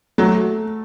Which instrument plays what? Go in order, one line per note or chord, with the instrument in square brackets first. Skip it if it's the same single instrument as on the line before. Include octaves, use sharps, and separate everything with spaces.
[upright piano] F#3 [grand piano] A3